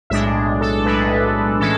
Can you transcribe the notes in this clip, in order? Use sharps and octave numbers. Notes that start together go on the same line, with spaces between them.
B1 A2 G#3 D4 E5
A4
B1 A2 G#3 D4 B4
A2 E3 G#3 C#4 A4